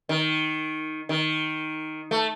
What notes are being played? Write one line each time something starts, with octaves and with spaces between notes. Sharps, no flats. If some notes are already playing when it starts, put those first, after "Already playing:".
D#3
D#3
A3